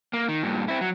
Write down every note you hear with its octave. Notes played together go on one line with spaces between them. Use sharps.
A#3
D#3
G2 A#2
C4 E4
F#3